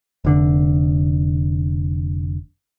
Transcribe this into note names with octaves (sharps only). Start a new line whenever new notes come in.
F1 D3